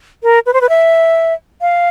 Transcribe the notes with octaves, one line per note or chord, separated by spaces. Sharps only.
A#4
B4
C5
B4
E5
F5